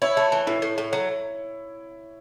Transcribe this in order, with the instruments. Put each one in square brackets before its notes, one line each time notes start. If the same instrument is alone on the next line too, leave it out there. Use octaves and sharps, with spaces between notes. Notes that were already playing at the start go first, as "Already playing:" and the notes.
[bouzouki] E4 [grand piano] C#5
[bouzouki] A3
E3
[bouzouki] A2 [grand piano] E4
[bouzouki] A2
A2
F#3